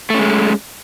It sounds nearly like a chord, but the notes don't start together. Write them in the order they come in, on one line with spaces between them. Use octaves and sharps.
A3 C#4 G#3